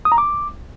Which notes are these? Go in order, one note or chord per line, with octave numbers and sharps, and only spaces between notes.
D#6
A#5
D6